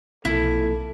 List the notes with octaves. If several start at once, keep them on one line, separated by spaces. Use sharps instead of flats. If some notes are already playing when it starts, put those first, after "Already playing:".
B1 C3 F3 A#3 E4 A4